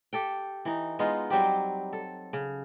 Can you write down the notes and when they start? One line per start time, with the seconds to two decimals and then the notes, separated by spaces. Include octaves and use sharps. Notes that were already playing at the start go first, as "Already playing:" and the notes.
0.13 G4 A4 G5
0.65 E3 D#4
0.99 G#3 B3 D#4 F4
1.30 F#3 G3 C4 G4
1.93 A4
2.33 C#3